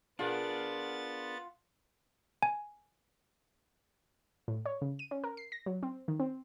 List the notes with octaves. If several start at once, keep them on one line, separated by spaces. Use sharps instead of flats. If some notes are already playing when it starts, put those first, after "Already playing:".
B3 D4 F4 G#4 A#4 F#5 A6
G#5
A2
C#5
C#3
D#7
C#4
A#4
C7
A#6
F#3
C4
D#3
C4